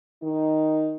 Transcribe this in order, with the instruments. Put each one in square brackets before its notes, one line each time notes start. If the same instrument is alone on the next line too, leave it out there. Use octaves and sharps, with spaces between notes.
[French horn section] D#3 D#4